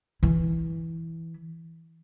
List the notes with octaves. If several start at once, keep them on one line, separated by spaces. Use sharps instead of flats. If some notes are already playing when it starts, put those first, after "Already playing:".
E3 E4